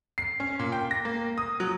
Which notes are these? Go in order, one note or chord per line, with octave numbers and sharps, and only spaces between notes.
C7
C#4
A#2
G5
A#6
A#3
D#6
F#3